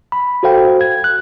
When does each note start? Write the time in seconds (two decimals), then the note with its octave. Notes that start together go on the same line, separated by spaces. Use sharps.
0.12 B5
0.43 F#4 A4 C5 F5 G5
0.81 G#6
1.04 F#6